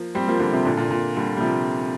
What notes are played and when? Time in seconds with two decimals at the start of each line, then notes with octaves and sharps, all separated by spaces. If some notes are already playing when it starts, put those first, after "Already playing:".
Already playing: F3 A#3
0.15 G3 C4
0.28 F3 A#3
0.40 D3 G3
0.53 C3 F3
0.65 A#2 D3
0.77 A#2
0.91 A#2
1.16 D3 G3
1.37 G3
1.41 C3 F3